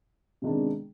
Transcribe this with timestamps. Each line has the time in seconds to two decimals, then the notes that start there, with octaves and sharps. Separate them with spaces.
0.42 C3 D#3 G#3 B3 D4